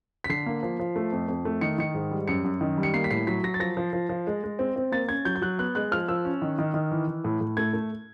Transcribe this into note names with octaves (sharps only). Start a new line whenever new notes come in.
B6
D3 C7
A#3
F3
F3
A3
F2
F2
A3
D#3 C#7
D#3 C#7
G#2
G3
F#2 C#7
F#2
D#3
G3
C#7
A#3 C7
B6
A2 C7
F#3 B6
F#3 A#6
A6
F3 A#6
F3
F3
F3
G#3
G#3
C4
C4
A#3 A6
C#4 G#6
F#3 G6
G6
F#3 F#6
B3 F#6
G#3 F#6
F3 F6
F3 E6
C#4
D#3
D#3
D#3
E3
E3
A2
A2
A3 G#6
A3